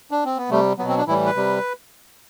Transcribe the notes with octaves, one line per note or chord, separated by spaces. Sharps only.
D4
C4
B3
C3 G3 A3
B2 F#3 B3
C4
D4
A2 E3 G3 E4
B4
C3 G3